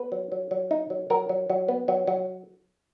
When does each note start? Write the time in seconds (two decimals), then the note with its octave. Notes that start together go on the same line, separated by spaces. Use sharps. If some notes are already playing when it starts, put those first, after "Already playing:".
Already playing: B3 B4
0.12 F#3
0.32 F#3
0.51 F#3
0.71 D#4
0.90 F#3
1.10 F#3 A#4
1.29 F#3
1.50 F#3
1.68 B3
1.88 F#3
2.07 F#3